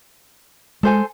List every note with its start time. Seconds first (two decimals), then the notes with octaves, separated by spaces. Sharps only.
0.83 G#3 A4 C5 G#5